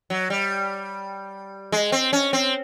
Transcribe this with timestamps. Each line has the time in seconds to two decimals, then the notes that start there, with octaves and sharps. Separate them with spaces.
0.10 F#3
0.30 G3
1.72 G#3
1.92 C4
2.13 C#4
2.33 C4